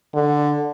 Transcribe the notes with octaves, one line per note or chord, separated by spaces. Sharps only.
D3